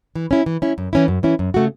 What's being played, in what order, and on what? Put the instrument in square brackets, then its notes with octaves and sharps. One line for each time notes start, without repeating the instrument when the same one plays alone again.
[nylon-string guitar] E3
C#4 E4
E3
C#4 E4
F#2
E3 C#4 E4
F#2
E3 C#4 E4
F#2
C#3 A3 F#4